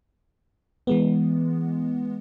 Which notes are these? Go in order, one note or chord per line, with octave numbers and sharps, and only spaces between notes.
E3 G#3 B3